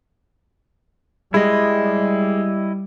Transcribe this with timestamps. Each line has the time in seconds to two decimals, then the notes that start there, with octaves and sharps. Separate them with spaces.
1.34 G3 G#3 E4 D#5